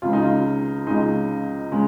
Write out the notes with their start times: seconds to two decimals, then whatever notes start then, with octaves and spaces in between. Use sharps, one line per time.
0.02 C#2 C#3 G#3 F4
0.13 D#4
0.23 F4
0.87 C#2 C#3 G#3 D#4
1.72 C#3 G#3